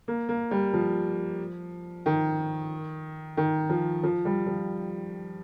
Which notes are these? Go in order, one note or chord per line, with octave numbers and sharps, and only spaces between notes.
A#3
A#3
G3
F3
D#3
D#3
F3
F3
G3
F3